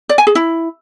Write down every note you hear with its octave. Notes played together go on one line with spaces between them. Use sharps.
D5
G#5
G#4
E4